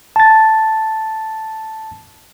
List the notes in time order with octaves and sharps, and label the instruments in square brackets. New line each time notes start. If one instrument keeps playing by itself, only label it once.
[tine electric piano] A5 A6